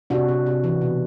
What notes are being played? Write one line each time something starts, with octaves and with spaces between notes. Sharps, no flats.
C3 D4 F#4
C3
C3
E3
B2